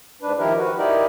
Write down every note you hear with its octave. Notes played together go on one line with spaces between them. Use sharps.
G#2 D4 B4
D#3 F3 E4 G4 A#4
F#4 B4
D#4 E4 G4 A#4 D5